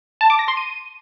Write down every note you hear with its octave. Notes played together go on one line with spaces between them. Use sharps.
A5
D6
A#6
C6
D#7